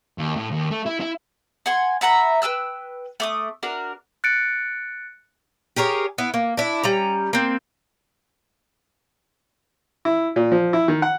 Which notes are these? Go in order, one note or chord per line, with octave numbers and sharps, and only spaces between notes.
D#2
A2
D#2
A3
E4
E4
F#5 G#5 C6
E5 F#5 A#5 B5
B4 G5 E6 F#6
A3 D6 D#6
D4 F#4 A#4
F#6 A6 C#7 D7
G4 G#4 A#4 C#5
B3 E4
A#3
D4 E4
G3 C#4 A#5
A#3 C4
E4
A#2
F3
E4
D#3
F#5